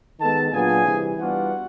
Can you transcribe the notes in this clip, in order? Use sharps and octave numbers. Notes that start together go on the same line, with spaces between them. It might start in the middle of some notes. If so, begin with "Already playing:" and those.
D#3 G#3 B3 A4 A5
A#2 F#3 B3 D4 F4 G#4 G#5
C3 E3 G3
E3 G3 B3 D4 F4 F#4 F#5